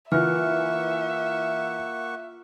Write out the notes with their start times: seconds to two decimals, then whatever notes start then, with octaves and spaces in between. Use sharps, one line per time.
0.12 E3 A#3 F4 E5 F#5 C#6 F6